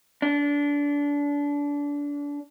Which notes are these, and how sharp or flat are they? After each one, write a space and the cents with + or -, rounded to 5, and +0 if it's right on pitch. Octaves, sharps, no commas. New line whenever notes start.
D4 -25